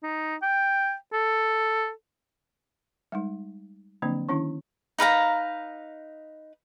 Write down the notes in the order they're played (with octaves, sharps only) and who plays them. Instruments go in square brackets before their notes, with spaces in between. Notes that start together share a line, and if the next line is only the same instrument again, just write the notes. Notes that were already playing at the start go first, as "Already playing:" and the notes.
[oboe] D#4
G5
A4
[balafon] G3 G#3 D#4
D3 F3 F#3 A#3 C4 D4
D#3 C#4 D4 E4
[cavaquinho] D#4 B4 F5 A#5